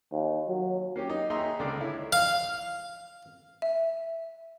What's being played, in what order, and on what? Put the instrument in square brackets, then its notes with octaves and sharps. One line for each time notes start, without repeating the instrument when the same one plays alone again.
[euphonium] D#2
F#3
[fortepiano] A#3 C#4 G4
D#4
D#2 D#4 G#4 E5 A#5 C6
C#2 D3 D5 D6
E4 C#5
[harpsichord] F5
[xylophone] E5